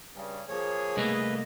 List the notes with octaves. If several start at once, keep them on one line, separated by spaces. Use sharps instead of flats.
G2 C#3
F3 A#3 G#4 C#5
C2 A3 A#3 B4 D#5